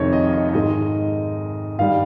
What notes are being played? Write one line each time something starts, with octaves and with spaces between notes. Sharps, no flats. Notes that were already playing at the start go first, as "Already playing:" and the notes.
Already playing: F2 C3 D#3 G#3 C#5
D#5
D#5
G#2 D#3 G#3 D#5
G2 D#3 G3 F5